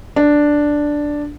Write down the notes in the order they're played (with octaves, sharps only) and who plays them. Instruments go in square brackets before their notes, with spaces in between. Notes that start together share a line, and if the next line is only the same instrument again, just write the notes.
[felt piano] D4